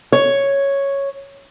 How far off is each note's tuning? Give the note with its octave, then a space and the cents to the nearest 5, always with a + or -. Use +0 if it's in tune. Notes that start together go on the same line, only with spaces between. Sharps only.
C#5 +0